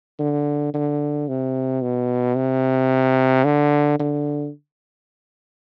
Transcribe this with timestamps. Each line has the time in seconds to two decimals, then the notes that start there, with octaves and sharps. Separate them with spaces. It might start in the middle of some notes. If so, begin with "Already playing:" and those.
0.19 D3
0.74 D3
1.28 C3
1.82 B2
2.36 C3
3.45 D3
3.99 D3